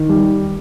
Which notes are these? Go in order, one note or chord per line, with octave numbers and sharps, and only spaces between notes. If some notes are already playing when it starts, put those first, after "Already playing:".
Already playing: D#3
G3